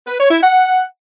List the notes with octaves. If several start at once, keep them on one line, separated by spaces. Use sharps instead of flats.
B4
C#5
E4
F#5